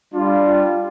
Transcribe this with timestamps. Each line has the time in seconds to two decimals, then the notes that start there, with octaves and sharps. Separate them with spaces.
0.14 G3 D4 F4